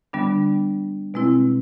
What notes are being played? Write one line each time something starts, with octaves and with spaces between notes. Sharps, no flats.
D3 G3 B3 D4
B2 G#3 C4 E4